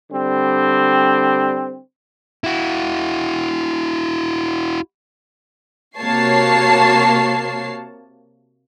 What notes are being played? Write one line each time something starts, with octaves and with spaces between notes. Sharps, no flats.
D3 G3 C4
E4 F#4
C3 A#3 F#4 C#5 A5 C7